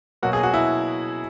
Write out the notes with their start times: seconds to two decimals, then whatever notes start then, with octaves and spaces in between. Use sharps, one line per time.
0.23 B2 F#3 A#3 F#4
0.33 G#4
0.43 F#4
0.54 E4